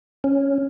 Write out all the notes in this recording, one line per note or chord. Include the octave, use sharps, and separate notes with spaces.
C#4